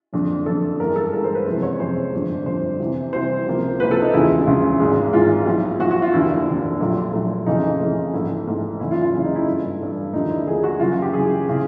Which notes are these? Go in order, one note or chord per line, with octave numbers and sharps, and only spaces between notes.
F#1 F2 D3
F#1 F2 D3 A4
G2 E3 G#3 A#4
A4
G2 E3 G#3 A#4
C5
B4
F#1 F2 C3 E3 G#3 C5
C#5
F#1 F2 C3 E3 G#3 C5
G1 F2 D3
G1 F2 D3 C5
C2 C3 E3
C2 C3 E3 C5
C#2 C3 F3 A#3
C#2 C3 F3 A#3 B4
A4
D#4
E1 D2 C#3 F3 G#3 E4
E1 D2 C#3 F3 G#3
G#1 G#2 E3 G#3
G#1 G#2 E3 G#3 F4
B1 A2 F3
B1 A2 F3 F#4
F#4
F4
F1 D#2 D3 E4
F1 D#2 D3
A#1 A#2 F#3 A3
A#1 A#2 F#3 A3
F2 C#3 E3 A3 D#4
F2 C#3 E3 A3
A#1 G#2 E3 A3 E4
A#1 G#2 E3 A3
F#1 E2 C#3 E4
F4
F4
F#1 E2 C#3 E4
D#4
E4
G2 E3 A3
G2 E3 A3
D#2 D3 F3 A3 D#4
E4
D#2 D3 F3 A3 G#4
F#4
F#2 C#3 E3 F4
F#4
G4
F#2 C#3 E3 G#4
C#3 E3